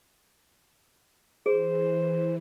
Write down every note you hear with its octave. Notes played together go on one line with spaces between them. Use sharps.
E3 G#4 C5